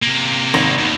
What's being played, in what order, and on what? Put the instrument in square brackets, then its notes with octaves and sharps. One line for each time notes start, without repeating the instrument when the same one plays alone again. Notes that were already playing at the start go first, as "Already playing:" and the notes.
[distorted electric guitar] C3 A#3
[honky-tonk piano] G#1 A#6
[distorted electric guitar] D#2 B2